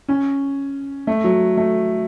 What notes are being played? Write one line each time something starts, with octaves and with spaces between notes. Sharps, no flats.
C#4
A3
F#3
A3